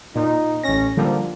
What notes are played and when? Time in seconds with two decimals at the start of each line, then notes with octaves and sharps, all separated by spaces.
0.15 A#2 D#4
0.64 A1 C#4 A#6
0.97 D3 F3 G3 A#3